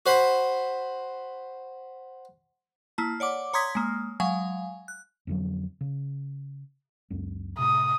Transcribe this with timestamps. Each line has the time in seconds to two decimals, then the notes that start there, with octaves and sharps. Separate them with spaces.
0.06 F#4 C5 B5 C6
2.98 A#3 E4 A5
3.20 C#5 D5 F#5 D6
3.53 C#5 A#5 C6 D#6 G#6 B6
3.75 G#3 A#3
4.20 F#3 G#3 F5 G#5
4.88 F#6
5.27 F2 D3 F#3
5.81 C#3
7.10 C#2 F#2
7.59 A2 C3 D#6